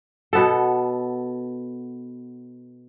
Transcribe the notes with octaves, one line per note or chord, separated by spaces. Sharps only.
B2 B3 A4